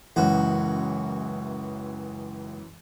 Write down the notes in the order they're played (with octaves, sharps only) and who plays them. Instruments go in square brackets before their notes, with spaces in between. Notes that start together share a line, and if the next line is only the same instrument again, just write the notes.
[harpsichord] C#2 F#4 [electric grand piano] F#2 E3